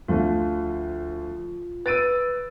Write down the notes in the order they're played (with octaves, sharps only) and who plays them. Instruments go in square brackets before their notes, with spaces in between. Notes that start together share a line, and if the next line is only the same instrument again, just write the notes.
[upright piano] D2 F3 [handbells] F4
[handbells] B4 E6 [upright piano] A6 D7 D#7